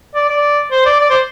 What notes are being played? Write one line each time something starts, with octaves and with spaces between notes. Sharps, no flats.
D5
D5
C5
D5
D5
C5